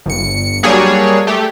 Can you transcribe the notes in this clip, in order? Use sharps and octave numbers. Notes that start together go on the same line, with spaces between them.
G1 C#7
F#3 G3 A#3 D4 G#4 C#5
A3 G4